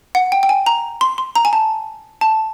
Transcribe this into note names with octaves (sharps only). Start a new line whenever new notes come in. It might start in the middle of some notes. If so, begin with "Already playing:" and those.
F#5
G5
G5
G#5
A#5
C6
C6
A#5
G#5
A5
A5